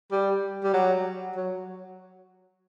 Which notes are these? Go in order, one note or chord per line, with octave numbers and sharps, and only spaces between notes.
G3
G3
F#3
F#3